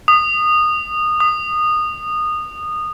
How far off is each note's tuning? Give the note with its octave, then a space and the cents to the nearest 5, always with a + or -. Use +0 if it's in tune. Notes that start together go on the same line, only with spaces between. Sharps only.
D#6 -20
D#6 -20